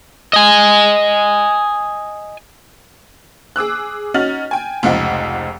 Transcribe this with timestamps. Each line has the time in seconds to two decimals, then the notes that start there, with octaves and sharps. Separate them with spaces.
0.33 D#5 G#5
3.56 G#4 D6 E6 F#6
4.14 C#4 D#4 F#4 F6 A6 F#7
4.51 G5 G#5
4.83 F1 C#2 F3 D#4 F#5